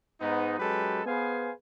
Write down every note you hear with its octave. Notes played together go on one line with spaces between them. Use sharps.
G#2 B3 D#4
F#3 G#3 C#4 G4 A4 B4
B3 G#4 B4 C5 F5 G#5